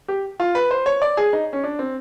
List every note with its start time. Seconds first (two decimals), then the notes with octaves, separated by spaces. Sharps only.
0.08 G4
0.40 F4
0.55 B4
0.71 C5
0.86 C#5
1.02 D5
1.17 G#4
1.33 D#4
1.53 C#4
1.64 D4
1.79 C4